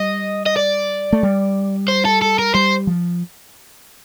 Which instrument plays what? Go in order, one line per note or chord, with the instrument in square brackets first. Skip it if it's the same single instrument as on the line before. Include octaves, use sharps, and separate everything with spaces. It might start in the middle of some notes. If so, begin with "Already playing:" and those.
Already playing: [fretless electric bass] G3 [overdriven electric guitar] D#5
[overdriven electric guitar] D#5
D5
[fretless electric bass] A3
G3
[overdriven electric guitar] C5
A4
A4
A#4
[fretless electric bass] G3 [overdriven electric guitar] C5
[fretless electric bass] F3